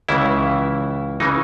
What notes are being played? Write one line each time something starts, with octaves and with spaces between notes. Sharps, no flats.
C#2 C#3 E3 E4
C#3 E3 D#4